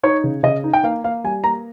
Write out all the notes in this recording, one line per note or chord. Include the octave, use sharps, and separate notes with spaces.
D#4 C#5
C#3
C#3 D#5
D#4
G5
A#3 F5
A#3 F5
G3 G#5
A#3 A#5